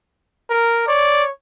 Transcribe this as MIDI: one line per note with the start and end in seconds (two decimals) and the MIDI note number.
0.50 0.87 70
0.88 1.30 73
0.88 1.24 74